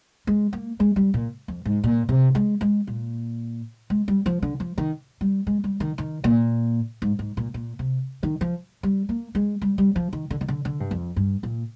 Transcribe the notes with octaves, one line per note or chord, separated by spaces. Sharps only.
G#3
A#3
G#3
G3
A#2
F2
G#2
A#2
C3
G#3
G#3
A#2
G#3
G3
F3
D3
F3
D#3
G3
G#3
G3
D#3
D#3
A#2
G#2
G#2
A#2
A#2
C3
D#3
F3
G3
A#3
G#3
G3
G3
F3
D#3
D3
D#3
D3
D3
G2
F2
G2
A#2